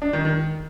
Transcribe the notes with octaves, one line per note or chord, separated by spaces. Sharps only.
D4
D#3
D#3